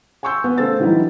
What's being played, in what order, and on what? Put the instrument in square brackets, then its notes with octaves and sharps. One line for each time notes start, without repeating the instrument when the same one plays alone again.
[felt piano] G#5 C6 C#6 E6 G6
B3
C#3 A3 A4 C5 E6 A6
D3 E3 F#3 G3 D#4 E4